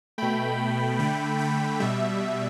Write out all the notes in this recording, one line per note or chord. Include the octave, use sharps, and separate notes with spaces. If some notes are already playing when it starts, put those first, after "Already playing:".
B2 A3 G5 B5
D3 A3 G5 B5
G5 B5
B2 G3 E5